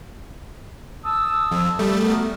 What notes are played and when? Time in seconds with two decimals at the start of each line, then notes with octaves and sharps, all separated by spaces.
1.04 A5 D#6 E6
1.51 F2
1.79 G3 A3
2.01 B3 F#4 A#4